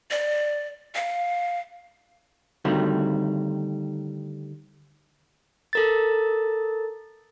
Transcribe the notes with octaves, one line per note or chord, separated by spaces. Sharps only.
D5
F5
D3 D#3 G3 A3 C4 F#4
A4 A#4 A6